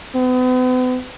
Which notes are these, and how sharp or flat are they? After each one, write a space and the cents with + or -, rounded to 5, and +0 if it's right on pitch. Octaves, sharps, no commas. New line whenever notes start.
B3 +40